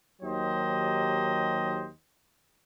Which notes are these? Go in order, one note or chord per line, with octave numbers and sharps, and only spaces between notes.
D#2 D#3 F#3 G4 C5 D#5